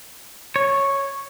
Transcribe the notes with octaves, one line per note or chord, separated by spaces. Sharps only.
C#5